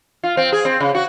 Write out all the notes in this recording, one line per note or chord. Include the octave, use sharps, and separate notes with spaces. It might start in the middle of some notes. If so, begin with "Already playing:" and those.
F4
C4
G#4
C4
C#3
F#4